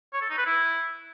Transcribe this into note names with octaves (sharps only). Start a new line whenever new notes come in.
C#5
A4
D#4
B4
E4